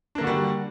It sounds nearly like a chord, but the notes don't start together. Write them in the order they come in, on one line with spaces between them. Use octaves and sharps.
D4 A#3 D3 F#4 G3